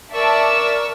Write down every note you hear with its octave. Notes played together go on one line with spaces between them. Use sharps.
A#4 D5 E5 A5 C#6 E6